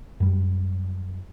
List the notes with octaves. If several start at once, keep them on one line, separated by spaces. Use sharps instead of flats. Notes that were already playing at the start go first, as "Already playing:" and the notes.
F#2 G3